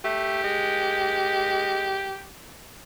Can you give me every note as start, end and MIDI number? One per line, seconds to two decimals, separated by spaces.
0.04 0.42 57
0.04 2.25 67
0.44 2.18 56